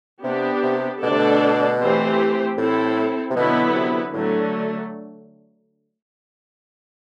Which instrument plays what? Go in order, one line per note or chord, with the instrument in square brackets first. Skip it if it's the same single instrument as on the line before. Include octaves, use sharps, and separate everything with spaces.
[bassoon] C3 [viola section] B3 D4 G4
[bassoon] C3
[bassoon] B2 [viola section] D3 A3 D4 A4 D5
[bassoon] C3
B2
[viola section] E3 A3 C4 G4 C5
[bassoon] A2 [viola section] C4 E4 A4
[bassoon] C3
[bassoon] B2 [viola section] D3 F#3 B3 E4 B4
[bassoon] C3
[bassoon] A2 [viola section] D3 F#3 A3